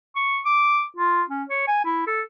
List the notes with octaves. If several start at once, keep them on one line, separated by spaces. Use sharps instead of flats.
C#6
D6
F4
C#4
C#5
G#5
E4
A4